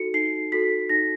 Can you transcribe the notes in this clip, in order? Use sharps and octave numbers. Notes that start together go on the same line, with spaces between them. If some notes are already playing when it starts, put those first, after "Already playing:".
Already playing: D#4 F#4 A4 C#7
D#4 C7
F#4 A4 B6
D#4 A#6